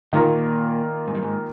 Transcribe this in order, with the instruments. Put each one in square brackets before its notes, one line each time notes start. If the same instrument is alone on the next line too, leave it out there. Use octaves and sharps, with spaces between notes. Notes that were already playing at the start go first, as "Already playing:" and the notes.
[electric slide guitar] A#2 [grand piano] D#3 A#3 F4 A#4
[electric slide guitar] G#2
G2
G#2